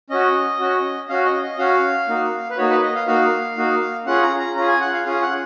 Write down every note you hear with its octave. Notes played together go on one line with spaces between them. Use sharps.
C#4 F#4 D#5
C#4 F#4
C#4 F#4 F5
D#5
D#5
C#4 F#4 F5
A#3 D#4 F#4
B4
A#3 D#4 F#4 C#5
B4
D#5
F5
A#3 D#4 F#4 F5
A#3 D#4 F#4
C#4 F4 G#4 F#5
A#5
A#5
C#4 F4 G#4 A#5
G#5
F#5
F5
C#4 F4 G#4 F5
F#5